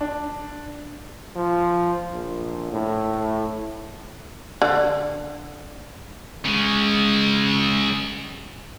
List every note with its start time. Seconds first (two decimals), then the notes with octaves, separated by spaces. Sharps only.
0.01 D4
1.36 F3
2.13 A#1
2.72 A2
4.62 D3
6.45 C#3 G#3